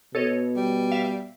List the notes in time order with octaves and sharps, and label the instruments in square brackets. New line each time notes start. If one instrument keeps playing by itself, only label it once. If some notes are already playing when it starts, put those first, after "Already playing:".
[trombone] B2 [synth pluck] A4 C#5 D#5
[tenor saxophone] G3
[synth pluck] E5 F5